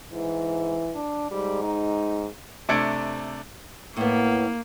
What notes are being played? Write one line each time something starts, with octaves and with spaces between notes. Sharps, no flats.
G#2 E3
D4
G#2 G3
D#4
C3 A3 D4 G#6 C#7 D7
A2 A#3 B3